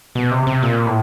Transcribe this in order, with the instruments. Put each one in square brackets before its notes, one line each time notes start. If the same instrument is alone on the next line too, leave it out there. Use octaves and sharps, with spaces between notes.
[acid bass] B2
C3
C3
A#2
A2